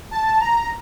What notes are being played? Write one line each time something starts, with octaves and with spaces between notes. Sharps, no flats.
A5
A#5